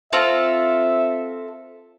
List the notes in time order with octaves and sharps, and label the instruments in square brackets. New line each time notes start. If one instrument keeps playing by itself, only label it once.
[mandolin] C4 F4 A4 [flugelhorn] E5